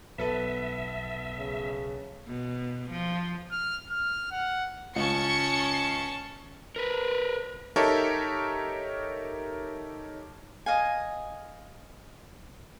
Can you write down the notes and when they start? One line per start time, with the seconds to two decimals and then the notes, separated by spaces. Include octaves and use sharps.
0.18 B1 B3 A4 B4 E5
1.38 C#3
2.27 B2
2.91 F3
3.51 F6
3.90 F6
4.31 F#5
4.96 C#2 C#4 A5 C#6 C#7
6.76 A#4 B4
7.76 D#4 G4 A4 A#4 C#5 E5
10.66 D#5 F5 G#5